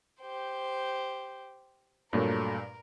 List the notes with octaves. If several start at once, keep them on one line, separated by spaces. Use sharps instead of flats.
G4 C5
G2 A#2 F#3 A3 A#3 A#4